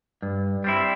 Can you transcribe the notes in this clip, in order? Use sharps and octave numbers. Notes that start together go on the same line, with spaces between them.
G2
G3 C4 E4